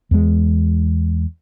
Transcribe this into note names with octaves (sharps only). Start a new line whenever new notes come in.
E2 G#3